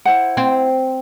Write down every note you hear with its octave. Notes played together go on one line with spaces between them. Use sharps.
E4 C5 F#5
C4